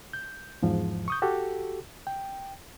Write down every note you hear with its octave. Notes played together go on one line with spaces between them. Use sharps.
G6
E2 G#2 F3
C#6 D#6 G6
F#4 G4 A4
G5